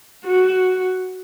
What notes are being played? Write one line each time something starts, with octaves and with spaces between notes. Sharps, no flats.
F#4